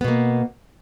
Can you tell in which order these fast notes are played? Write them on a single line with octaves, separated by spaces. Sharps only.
B3 B2 A#3